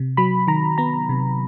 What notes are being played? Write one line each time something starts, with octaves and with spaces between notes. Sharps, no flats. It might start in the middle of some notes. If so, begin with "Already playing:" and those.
Already playing: C3
F#3 B5
D#3 A#5
B3 A#5
C3